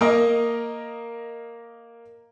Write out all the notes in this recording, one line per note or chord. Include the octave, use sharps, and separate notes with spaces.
A#3 A#4 D#5 A#5